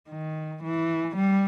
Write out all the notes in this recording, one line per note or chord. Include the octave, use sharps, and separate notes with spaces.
D#3
E3
G3